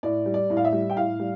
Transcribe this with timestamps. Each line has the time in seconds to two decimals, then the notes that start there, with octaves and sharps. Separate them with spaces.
0.03 A2 D5
0.26 G3
0.34 D5
0.50 A2
0.57 F5
0.65 E5
0.73 G3
0.90 G5
0.96 A2 F5
1.19 G3